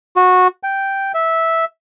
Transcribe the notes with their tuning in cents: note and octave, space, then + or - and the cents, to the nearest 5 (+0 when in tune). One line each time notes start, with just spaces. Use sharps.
F#4 -15
G5 -5
E5 -10